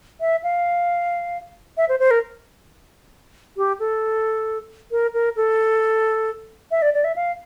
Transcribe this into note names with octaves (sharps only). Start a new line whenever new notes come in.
E5
F5
E5
C5
C5
A#4
G4
A4
A#4
A#4
A4
E5
D5
D5
E5
F5